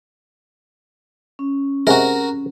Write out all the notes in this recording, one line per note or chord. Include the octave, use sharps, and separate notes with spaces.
C#4
C3 G#3 F#4 A#4